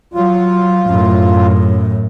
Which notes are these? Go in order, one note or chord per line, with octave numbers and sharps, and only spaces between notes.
F#3 F4
F#2 A2